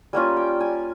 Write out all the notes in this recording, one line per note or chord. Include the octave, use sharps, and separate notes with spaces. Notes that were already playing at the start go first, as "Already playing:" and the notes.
G3 A#3 C#4 F4 G#5
G5
G#5